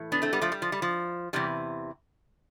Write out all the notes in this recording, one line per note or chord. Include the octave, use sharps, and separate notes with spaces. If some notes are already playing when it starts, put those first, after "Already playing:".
Already playing: A2 E3
B3 D4
A3 C4
G3 B3
F3 A3
G3
F3
G3
F3
E2 C3 E3 G3